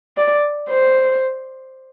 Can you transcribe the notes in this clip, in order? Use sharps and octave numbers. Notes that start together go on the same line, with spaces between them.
D5
C5